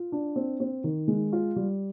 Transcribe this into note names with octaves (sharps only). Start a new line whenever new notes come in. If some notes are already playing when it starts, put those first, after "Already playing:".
Already playing: F4
D4
C4
C4
D#3
G#3
F4
G3